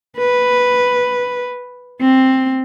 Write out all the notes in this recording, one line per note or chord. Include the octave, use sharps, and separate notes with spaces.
B4
C4